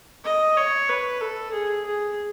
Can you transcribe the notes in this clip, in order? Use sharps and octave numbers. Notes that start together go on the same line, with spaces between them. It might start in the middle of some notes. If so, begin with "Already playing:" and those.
D#5
C#5
B4
A4
G#4
G#4